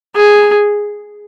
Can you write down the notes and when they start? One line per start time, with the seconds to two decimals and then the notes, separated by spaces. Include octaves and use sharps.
0.16 G#4